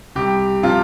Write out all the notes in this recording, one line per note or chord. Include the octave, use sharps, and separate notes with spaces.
C2 G4
C3 F3 F4